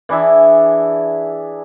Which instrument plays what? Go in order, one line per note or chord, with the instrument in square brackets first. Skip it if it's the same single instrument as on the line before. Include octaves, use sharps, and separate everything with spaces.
[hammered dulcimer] E3 D4 G#4 E5